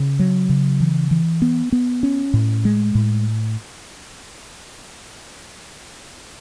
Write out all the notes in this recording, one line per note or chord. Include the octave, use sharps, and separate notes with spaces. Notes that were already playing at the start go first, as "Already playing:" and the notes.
Already playing: C#3 C#4
F#3
C#3
E3
E3
B3
B3
C#4
A2
G#3
A2